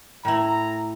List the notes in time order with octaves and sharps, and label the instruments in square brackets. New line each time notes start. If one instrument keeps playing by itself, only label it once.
[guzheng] A2 E4 [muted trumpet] A#5